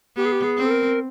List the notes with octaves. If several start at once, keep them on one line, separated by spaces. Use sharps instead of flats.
B3 G4
G#4
G4
G#4
C4
A4
A#4